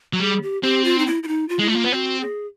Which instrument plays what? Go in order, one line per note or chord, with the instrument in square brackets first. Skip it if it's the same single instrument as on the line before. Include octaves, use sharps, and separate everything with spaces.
[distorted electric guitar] F#3
[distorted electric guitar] G3 [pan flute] G#4
[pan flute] G4
[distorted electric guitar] C4 [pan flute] G4
[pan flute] F4
D#4
E4
E4
D#4
F4
[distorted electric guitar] G#3 [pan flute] E4
[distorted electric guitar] A3 [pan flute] F4
[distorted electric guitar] A#3
B3
[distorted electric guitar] C4 [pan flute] F#4
[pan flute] G#4